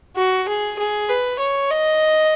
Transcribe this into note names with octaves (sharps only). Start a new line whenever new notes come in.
F#4
G#4
G#4
B4
C#5
D#5